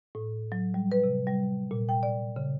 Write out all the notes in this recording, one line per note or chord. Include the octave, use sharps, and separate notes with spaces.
A2
F#3
G3
B4
C3
G3
A#2
G5
D5
C#3